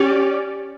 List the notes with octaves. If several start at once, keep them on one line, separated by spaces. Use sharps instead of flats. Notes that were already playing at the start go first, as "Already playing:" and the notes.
Already playing: C#4 G4 D5